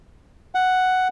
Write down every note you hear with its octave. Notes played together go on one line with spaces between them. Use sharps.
F#5